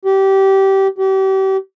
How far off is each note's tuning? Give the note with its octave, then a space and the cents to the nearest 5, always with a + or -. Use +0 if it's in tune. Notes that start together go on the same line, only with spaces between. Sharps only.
G4 -20
G4 -35